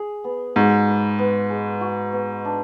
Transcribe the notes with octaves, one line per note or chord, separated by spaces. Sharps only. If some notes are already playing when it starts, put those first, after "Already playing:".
Already playing: G#4
B3
G#2 F#4
B4
B3
G#3
F#4
B3
D4